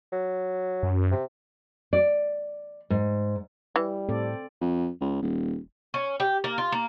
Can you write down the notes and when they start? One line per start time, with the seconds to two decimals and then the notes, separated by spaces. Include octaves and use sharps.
0.12 F#3
0.83 F#2
1.11 C3
1.93 D5
2.90 G#2
3.76 E3 G3
4.09 A2 C4 A4 D5
4.61 F2
5.01 C#2
5.22 D#1
5.94 C#4
6.20 G4
6.44 A#3
6.58 F4
6.72 A#3